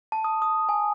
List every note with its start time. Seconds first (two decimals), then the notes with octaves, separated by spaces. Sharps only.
0.12 A5
0.24 D#6
0.42 D#6
0.69 G#5